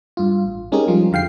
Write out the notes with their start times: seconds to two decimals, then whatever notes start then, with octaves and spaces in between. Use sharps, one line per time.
0.17 G2 F4
0.45 A1
0.72 G#3 C#4 D#4 G4 G#4 A#4
0.88 F3 G3 F4
1.12 F2 D3 F5 G5 C7